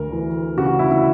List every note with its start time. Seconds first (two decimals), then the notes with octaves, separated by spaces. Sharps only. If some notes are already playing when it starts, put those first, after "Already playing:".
Already playing: D2 A#4
0.12 E3
0.57 C#3 F#4
0.79 E4
0.91 E4